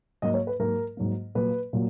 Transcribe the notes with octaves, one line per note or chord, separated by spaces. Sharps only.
G#2 F#3 A#3 D#5
C#5
B4
G#2 F#3 A#3 A#4
G#2 F#3 A#3
A#2 F#3 A#3 B4
A#2 F#3 A#3